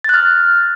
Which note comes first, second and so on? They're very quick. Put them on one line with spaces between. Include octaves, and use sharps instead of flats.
A6 F#6 F6